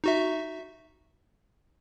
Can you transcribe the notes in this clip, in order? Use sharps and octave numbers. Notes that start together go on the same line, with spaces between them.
D#4 F#4 E5